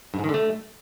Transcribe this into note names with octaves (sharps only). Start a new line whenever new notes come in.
G2
G#2
D#3
D3
A3